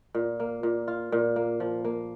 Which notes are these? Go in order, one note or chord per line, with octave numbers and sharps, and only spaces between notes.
A#2
A#3
A#2
F4
A#2
A#3
F3
A#3